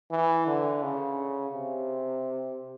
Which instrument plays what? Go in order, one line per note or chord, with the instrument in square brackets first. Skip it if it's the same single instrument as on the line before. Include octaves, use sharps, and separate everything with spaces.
[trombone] E3
D3
C#3
C3